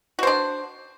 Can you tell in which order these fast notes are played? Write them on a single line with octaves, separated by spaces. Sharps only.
F#4 C5 D4